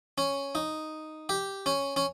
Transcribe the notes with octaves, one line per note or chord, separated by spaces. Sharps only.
C#4
D#4
G4
C#4
C#4